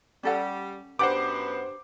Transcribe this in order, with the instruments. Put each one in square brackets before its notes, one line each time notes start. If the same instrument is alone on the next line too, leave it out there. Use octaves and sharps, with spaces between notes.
[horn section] G3 [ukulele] C#4 A4 F#5
[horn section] F#2 B3 [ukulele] D4 G4 B4 [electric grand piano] C5 F#5 D6